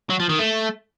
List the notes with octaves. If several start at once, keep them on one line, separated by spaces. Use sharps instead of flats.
F#3
F3
D#3
A3